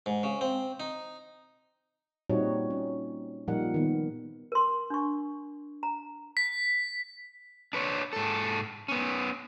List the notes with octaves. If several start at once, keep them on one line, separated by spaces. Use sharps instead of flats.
G#2
C#3
C4
D#4
A#2 G3 C4 D#4 F#4 C#5
C#4
A#2 F3 G3 D#4 A#4 F#5
D#3 B3
A#4 C6
D4 C#6
A#5
B6
D4 B4 C#5
G#2 A4
B3 C#4